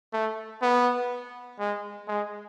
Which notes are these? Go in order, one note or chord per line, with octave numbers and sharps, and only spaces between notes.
A3
B3
G#3
G#3